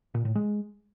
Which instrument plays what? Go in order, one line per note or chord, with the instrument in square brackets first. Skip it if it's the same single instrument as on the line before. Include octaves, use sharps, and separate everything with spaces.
[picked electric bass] A#2
A2
G#3